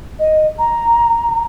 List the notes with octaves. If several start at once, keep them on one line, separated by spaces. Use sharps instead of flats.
D#5
A#5